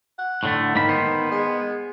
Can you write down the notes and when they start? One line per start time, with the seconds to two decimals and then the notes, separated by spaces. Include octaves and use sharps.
0.19 F#5
0.43 A2 D3 A3
0.74 G#2 D#3 A#3 B5
0.89 B3 C5
1.31 G#3